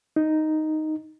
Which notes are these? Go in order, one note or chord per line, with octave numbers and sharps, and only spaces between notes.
D#4